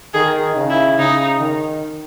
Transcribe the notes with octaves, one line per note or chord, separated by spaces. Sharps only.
D#3 G#4
C#3
E4
C#3 D#4
D#3